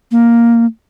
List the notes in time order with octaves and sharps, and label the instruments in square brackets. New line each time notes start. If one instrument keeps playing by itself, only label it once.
[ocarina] A#3